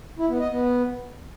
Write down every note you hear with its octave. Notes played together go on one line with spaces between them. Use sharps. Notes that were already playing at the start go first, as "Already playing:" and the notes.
E4
B3
D#5
B3